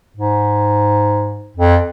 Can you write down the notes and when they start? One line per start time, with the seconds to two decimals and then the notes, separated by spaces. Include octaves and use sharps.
0.17 G#2
1.56 F2